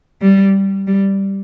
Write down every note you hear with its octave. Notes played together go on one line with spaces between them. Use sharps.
G3
G3